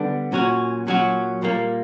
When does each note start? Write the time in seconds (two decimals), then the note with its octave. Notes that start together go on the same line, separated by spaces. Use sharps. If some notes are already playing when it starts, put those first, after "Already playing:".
Already playing: D3 G3 B3 D4
0.32 A#2 F#3 C#4 F#4
0.87 A#2 F#3 C#4 F#4
1.42 A#2 G3 A#3